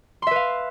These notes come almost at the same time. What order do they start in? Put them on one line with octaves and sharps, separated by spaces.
C6 E5 B4 F5